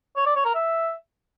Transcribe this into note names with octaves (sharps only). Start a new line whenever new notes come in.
C#5
D5
C#5
A#4
E5